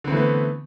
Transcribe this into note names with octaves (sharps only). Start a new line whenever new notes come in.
D3 E3 A3 B3 C4